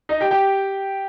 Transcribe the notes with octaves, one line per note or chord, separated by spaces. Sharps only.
D#4 D#5
G4 G5
G4 G5